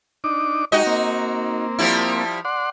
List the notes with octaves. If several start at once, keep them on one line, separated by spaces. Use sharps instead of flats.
D4 D#4 D6
G#3 D#4 F#4 G4 D#5
A#3 C4
F3 G3 E4
D5 F#5 C6